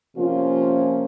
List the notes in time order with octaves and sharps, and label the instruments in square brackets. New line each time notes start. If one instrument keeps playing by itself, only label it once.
[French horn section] C3 F3 A#3 C#4 F4